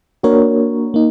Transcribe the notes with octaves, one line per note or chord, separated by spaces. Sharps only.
A#3 D4 F#4 A#4 C#5
A#3 D#4